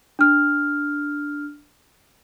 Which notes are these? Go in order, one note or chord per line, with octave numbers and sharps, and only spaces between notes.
D4 F6